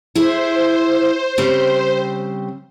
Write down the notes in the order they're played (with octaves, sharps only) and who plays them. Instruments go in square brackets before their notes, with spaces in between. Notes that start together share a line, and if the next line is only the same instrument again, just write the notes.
[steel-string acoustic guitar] E4 G#4 [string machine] C5
[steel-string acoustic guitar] C#3 G3 C4